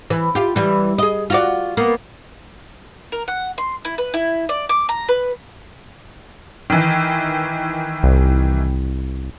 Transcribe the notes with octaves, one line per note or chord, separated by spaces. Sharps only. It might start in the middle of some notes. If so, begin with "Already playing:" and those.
E3
F4 G4
E3 G3
G#4 D#5
F4 F#4 D5
A#3 B3
A#4
F#5
C6
E4
B4
E4
D5
D6
A#5
B4
D#3 E3
C2